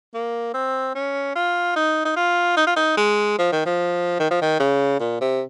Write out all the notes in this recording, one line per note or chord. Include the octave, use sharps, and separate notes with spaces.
A#3
C4
C#4
F4
D#4
D#4
F4
D#4
F4
D#4
G#3
F3
D#3
F3
D#3
F3
D#3
C#3
A#2
C3